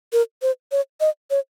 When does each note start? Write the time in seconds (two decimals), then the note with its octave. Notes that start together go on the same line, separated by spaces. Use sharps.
0.13 A#4
0.42 C5
0.72 C#5
1.01 D#5
1.31 C#5